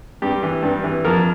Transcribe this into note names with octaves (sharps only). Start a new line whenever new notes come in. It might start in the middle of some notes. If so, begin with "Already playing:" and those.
G2 G4
E3
G2
E3
F2 A#4